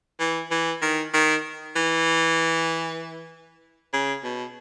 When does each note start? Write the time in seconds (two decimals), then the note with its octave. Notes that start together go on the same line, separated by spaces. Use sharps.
0.20 E3
0.51 E3
0.82 D#3
1.14 D#3
1.76 E3
3.93 C#3
4.24 B2